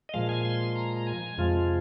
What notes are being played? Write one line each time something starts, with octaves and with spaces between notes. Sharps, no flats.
D#5
A#2 F3 G#3 F5
G#5
C6
A#5
A#5
G#5
F2 C3 F3 G#3 F4